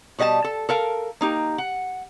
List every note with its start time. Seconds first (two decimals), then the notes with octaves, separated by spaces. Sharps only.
0.19 B2 G3 D#5 G#5 A5
0.44 A4
0.69 A4 A#4 F5
1.21 A#3 D#4 G4
1.58 F#5